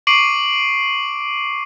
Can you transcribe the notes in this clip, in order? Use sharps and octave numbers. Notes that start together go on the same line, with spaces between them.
C#6 D6 C7 D7 D#7 F#7